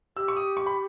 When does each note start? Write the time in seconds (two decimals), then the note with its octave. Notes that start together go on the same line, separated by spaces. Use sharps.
0.17 G4 E6
0.28 C#6
0.37 D#6
0.57 C#6
0.66 B5